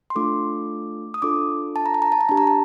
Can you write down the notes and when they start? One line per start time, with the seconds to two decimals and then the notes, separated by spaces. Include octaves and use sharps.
0.10 C6
0.15 A3 D4 F4 A4 D6
1.14 D#6
1.22 D4 F4 A4 D6
1.76 A5
1.86 A#5
1.94 A5
2.02 A#5
2.12 A5
2.21 A#5
2.29 D4 G4 A5
2.37 A#5
2.47 A5